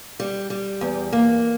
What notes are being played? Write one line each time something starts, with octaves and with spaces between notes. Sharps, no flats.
G3
G3
E2
A#3